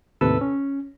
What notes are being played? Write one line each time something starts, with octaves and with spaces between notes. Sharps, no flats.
D#2 A2 C3 A4 B4 E6
C#4